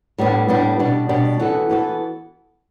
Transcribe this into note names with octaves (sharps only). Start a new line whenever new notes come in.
A2 G3 B3 D4 G4
A2 G3 B3 D4 G4
B2 G3 D4
B2 G3 D4
E3 B3 F#4 A4
E3 B3 F#4 A4